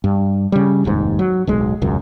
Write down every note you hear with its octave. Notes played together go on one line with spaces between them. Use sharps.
G2
C#3 G3
F1 D#2 G#2
F#3
D1 B1 G#3
E1 C#2 F#2